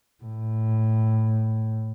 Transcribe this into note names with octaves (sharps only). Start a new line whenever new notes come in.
A2